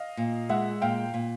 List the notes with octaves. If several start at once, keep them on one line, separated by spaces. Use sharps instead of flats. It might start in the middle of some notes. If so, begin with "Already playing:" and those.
Already playing: D#5 F5
A#2
G#3 E5 F#5
A#2 F5 G5
A#2